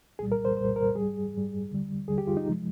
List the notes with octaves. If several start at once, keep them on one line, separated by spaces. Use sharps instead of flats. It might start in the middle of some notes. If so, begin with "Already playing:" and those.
C2 A#2 G3 G#4
A#4
C5
C2 A#2 G3 C5
A#4
G#2 G3 G#4
G#2 G3
D#2 D3 G3
D#2 D3 G3 G#4
G4
F4
D#4
C3 F3 G#3